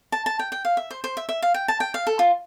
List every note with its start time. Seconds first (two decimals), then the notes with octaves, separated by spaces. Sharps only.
0.12 A5
0.26 A5
0.39 G5
0.52 G5
0.65 F5
0.77 E5
0.91 C5
1.04 C5
1.17 E5
1.29 E5
1.42 F5
1.54 G5
1.68 A5
1.80 G5
1.94 F5
2.07 A4
2.19 F4